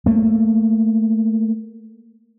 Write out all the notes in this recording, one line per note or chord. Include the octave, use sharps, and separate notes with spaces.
A3 A#3